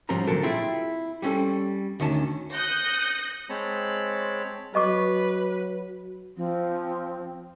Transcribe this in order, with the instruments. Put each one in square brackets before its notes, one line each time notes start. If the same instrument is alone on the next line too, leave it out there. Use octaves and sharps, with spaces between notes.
[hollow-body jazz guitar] G#2 F3 G3 C4 C#4 A#5
D2 A#2 F#3 A4 A#4 A5
C4 E4 F4 G#4 G5
G3 C4 C#4 F#4 A4
D2 D#3 C#4 A5
[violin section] D#6 F#6 G6 A#6 C#7
[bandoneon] G#3 C4 C#5 A5 B5
[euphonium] F#3 [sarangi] B4 [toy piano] D#5 C#6 D6
[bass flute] F3 [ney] C4